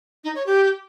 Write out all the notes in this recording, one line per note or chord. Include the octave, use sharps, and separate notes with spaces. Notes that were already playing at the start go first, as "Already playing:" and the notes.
D#4
C#5
G4